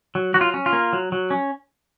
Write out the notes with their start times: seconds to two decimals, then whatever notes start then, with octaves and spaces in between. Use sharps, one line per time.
0.15 F#3
0.34 F#3 F#4
0.41 F4
0.54 C#4
0.66 F4
0.73 A#3
0.93 F#3
1.12 F#3
1.31 C#4